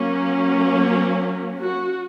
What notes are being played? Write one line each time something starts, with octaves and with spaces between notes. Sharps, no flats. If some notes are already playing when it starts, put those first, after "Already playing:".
Already playing: F#3 A#3 C#4
F#4